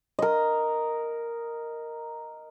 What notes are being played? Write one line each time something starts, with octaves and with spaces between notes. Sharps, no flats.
A#4 D#5